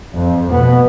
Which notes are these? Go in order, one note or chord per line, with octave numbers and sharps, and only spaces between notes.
F2
B2 B3